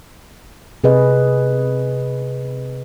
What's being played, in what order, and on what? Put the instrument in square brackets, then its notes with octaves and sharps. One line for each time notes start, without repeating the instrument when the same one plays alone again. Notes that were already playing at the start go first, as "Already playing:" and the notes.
[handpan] C3 G#4 B4 D#5